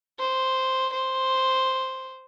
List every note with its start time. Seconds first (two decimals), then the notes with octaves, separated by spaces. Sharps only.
0.19 C5
0.93 C5